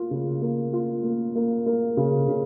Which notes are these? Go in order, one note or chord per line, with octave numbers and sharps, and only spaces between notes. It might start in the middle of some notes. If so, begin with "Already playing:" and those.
Already playing: A#3 F4
C#3
A#3
F4
A#3
A#3
A#3
C#3
C#3